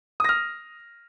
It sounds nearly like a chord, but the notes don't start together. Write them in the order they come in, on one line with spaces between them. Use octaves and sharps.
D#6 A#6 F6